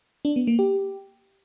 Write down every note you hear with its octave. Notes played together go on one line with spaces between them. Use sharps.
D4
B3
A#3
G4